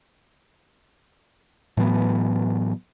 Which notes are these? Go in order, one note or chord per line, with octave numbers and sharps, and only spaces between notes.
A2 E3 F#3 B3